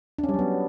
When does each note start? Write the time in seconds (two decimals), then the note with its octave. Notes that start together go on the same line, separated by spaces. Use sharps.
0.18 D4
0.24 C#4
0.29 G3
0.34 F#3
0.39 B3